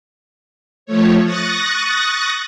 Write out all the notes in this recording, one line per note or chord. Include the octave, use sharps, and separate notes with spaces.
F3 A3 C#5
C#6 D#6 F#6 A6 A#6